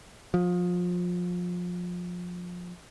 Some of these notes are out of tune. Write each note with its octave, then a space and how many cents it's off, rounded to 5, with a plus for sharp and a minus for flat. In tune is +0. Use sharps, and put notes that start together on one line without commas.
F3 +25